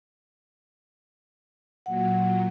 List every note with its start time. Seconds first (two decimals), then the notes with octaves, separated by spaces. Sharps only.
1.86 A#2 F#3 F#5